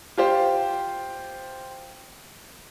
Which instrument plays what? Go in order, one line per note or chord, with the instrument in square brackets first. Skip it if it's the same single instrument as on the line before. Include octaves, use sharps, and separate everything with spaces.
[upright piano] F4 G4 C5